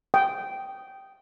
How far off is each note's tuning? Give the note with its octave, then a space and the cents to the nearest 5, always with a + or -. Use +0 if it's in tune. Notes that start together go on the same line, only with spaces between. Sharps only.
G5 -10 D#6 +0